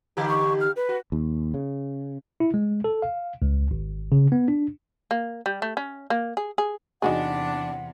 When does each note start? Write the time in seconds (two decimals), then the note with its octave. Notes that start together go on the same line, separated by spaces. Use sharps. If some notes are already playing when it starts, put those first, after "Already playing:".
0.17 D3 D#4 G4
0.29 C#6
0.61 F6
0.76 B4
0.89 F#4
1.12 D#2
1.54 C#3
2.40 E4
2.54 G#3
2.84 A4
3.02 F5
3.42 C#2
3.71 G#1
4.12 C#3
4.32 B3
4.48 D4
5.11 A#3
5.46 G3
5.62 A3
5.77 C#4
6.10 A#3
6.37 G#4
6.58 G#4
7.02 E2 C3 D4 D#4 F#4 G#4 F#5